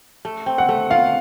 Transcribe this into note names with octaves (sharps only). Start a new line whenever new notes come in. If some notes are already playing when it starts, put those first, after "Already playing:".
A3
C4
F#5
A3
F4 F5